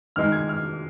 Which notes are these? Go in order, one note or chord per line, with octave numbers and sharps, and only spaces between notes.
D#3 G#3 D#4 F6
G#6
F6